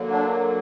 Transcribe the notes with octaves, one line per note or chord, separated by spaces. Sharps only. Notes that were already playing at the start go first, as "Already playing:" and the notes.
Already playing: D3 F#3 A#3
D4